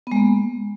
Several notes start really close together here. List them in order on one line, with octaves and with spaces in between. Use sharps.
B3 G#3 A#3